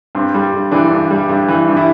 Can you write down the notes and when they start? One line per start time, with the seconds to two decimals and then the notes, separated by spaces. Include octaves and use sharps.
0.15 G2 C4
0.34 G3
0.53 G2
0.72 E3 D4
0.91 G2
1.10 G3
1.29 G2
1.48 E3
1.68 G2
1.77 E4